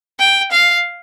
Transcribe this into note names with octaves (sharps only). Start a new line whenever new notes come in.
G5
F5